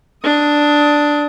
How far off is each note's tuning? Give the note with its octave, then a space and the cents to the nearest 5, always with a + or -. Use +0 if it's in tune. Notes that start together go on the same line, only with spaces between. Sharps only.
D4 +0 D#6 +20